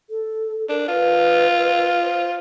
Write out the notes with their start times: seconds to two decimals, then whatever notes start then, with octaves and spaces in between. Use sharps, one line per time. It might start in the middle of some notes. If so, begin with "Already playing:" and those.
0.10 A4
0.69 D4 A#4
0.88 F4 B4
2.03 C5